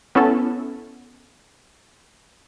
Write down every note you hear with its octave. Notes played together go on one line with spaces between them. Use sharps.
B3 C#4 E4 A4